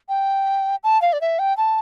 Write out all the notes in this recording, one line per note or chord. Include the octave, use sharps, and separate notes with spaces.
G5
A5
F5
D5
E5
G5
A5